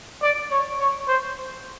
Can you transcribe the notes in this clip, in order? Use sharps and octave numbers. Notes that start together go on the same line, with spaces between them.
D5
C#5
C#5
C5